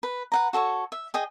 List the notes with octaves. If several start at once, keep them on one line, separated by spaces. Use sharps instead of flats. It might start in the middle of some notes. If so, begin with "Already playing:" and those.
B4
B4 F#5 A#5
F#4 A4 C#5 C#6
E5
G#4 D#5 G5